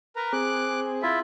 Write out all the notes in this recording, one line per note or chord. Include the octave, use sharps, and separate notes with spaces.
A#4 B4 A#5
C4 G#4 D6 F#6
E4 F4 E5